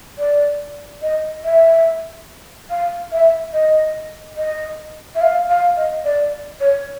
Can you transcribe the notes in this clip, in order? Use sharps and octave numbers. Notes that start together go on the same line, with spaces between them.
D5
D#5
E5
F5
E5
D#5
D#5
E5
F5
F5
D#5
D5
C#5